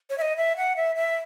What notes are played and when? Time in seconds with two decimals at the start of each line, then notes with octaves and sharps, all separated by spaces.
0.10 C#5
0.18 E5
0.21 D#5
0.37 E5
0.57 F#5
0.76 E5
0.96 E5